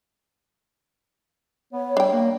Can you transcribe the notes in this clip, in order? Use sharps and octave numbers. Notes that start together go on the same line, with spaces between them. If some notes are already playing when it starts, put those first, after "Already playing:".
B3 C#5
G3 D4 G5
A#3